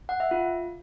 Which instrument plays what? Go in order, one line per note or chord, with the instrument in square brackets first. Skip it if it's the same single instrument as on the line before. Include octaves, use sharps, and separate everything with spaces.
[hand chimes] F#5
E5
F4